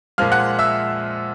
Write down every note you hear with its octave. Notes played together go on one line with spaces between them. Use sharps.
A#2 F3 G#3 F5 F6
F#5 F#6
E5 E6